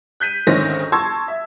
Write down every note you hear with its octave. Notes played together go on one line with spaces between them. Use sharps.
F#6 G6 B6 D#7
D2 G#2 D#3 C4 C#4 A#6
A5 C6 C#6 E6 G#6
E5